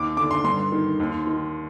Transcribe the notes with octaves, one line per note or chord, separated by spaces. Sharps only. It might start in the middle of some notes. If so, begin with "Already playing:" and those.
Already playing: D#2 D6
D3 D6
C6
G2 C6
D#3
D#2
D#3